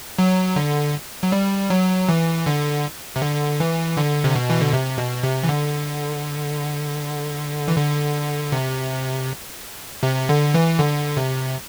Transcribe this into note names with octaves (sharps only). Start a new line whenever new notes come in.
F#3
D3
F#3
G3
F#3
E3
D3
C3
D3
E3
D3
C3
B2
E3
D3
C3
B2
C3
E3
D3
E3
D3
C3
C3
D3
E3
D3
C3